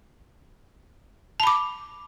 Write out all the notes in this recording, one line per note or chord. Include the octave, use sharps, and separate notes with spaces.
A5 B5 D6